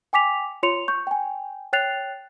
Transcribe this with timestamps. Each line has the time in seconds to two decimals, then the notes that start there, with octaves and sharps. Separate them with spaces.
0.13 G5 G#5 D6 B6 F7
0.63 F4 C#5 C6 C#7 F7
0.88 C#6 G6
1.07 G5 G#5
1.73 C#5 G5 F#6 A6 C7 F7